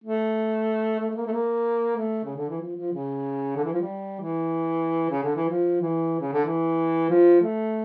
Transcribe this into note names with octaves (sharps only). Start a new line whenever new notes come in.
A3
A3
A3
A#3
A3
A#3
A3
C#3
D3
E3
F3
F3
C#3
D3
E3
F3
G3
E3
C#3
D3
E3
F3
E3
C#3
D3
E3
F3
A3